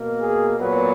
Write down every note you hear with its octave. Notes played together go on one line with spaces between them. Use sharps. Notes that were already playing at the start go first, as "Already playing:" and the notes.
Already playing: B2 A#3
G#4
A#2 F#3 B3 B4